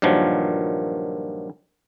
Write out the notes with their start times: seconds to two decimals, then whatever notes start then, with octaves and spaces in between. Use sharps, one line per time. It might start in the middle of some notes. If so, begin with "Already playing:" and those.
0.02 G2 A#2 D#3 F3 F#3